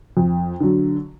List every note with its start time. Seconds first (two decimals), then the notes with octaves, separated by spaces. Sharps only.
0.17 F2
0.60 D3 F#3